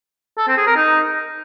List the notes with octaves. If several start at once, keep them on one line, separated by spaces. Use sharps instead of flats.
A4
C4
G#4
A#4
D#4